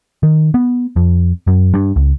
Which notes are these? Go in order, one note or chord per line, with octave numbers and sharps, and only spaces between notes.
D#3
B3
F2
F#2
G2
C#2